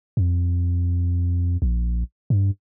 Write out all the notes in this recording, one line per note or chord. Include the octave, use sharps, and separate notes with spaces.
F2
A#1
G2